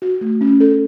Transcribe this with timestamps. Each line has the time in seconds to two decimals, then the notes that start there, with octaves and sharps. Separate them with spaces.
0.02 F#4
0.21 A3
0.41 C#4
0.60 A4